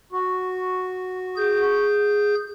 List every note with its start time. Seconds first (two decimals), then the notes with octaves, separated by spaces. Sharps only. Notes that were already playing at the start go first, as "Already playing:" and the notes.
0.13 F#4
1.37 G#4 G6